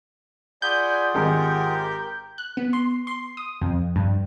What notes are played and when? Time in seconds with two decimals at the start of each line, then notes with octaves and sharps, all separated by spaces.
0.62 F4 G#4 D5 F#5 G#5 B5 G6
1.14 G#1 G#3 G4 A#4
2.38 F#6
2.57 B3
2.73 C6
3.07 C6
3.37 D#6
3.62 F2
3.96 G2